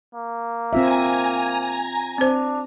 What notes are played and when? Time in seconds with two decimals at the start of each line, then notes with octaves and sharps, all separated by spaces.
0.15 A#3
0.73 C4 F4 E5 G#5 A#5
2.18 C4 D4 C5